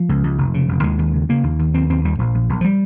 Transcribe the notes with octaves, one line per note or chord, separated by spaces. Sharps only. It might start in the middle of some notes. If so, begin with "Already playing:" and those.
Already playing: F3
C#2
C#2
F1
C#3
F1
D#2 G#3
D#2
C#3
C#3 A#3
D#2
D#2
D#2 C4
D#2 C4
D#2 G3
A#1 F3
A#1
A#1
F3
G3